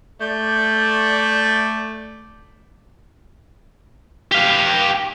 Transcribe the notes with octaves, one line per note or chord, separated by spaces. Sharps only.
A3 D5 G6
G4 F5